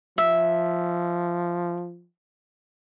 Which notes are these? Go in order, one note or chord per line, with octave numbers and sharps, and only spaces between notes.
F3 E5